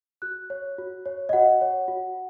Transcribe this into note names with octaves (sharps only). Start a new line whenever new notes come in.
F#4 F#6
C#5
F#4
C#5
D#5
F#4 F#5
C#5
F#4